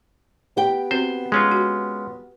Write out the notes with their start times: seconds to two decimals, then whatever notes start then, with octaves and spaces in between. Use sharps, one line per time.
0.57 B3 G4 G5
0.91 C4 F#4 B4 C5
1.32 G#3 C#4 F4
1.52 F#4